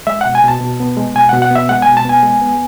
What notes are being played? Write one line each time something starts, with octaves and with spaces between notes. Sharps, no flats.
G#3 E5
B2 F#5
G#5
B2 A5
B2
B3
G#3
B2 G#5
B2 F#5
F#5
B3 E5
G#3 F#5
G#5
B2
A5
B3 G#5
G#3
B3